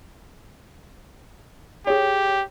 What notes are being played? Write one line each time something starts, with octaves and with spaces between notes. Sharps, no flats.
G4 G#4 C#5